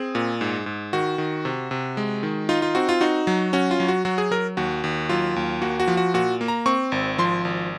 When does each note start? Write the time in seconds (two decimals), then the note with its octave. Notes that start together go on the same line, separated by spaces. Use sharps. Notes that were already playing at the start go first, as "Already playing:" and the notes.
Already playing: C4 G#4
0.15 A#2
0.41 G#2
0.66 G#2
0.93 D#3 F#4
1.18 D#3
1.45 C3
1.71 C3
1.97 G#3
2.23 D#3
2.49 D#4 F4
2.62 F4
2.75 C4 F#4
2.89 F4
3.01 D#4 F#4
3.27 F#3
3.53 C#4 F#4
3.71 F4
3.80 F#3
3.88 F#4
4.05 F#3 F#4
4.18 G#4
4.31 F#3 A#4
4.57 D#2 F#4
4.84 D#2
5.09 F#3 F4
5.36 D#2
5.62 A#3 F#4
5.80 F#4
5.88 F3
5.97 F#4
6.14 A#2 F#4
6.41 A#3
6.48 A#5
6.66 C4 C#6
6.92 G#1
7.18 F3 C6
7.45 G#1